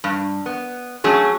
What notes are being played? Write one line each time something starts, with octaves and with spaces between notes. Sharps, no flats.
G2
B3
F#3 A3 C#4 G#4